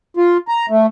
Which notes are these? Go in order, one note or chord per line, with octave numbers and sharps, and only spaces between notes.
F4
A#5
A3